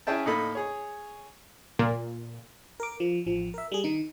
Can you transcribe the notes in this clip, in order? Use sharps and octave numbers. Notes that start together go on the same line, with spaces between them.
C#4 E4 G#4 E5 G5 A5
A2 A#3 D#4 A4 B5
G#4 C#5
A#2
A#4 D6
F3
A1 F3
A#4 E5
G3 G#4
D#3 D#4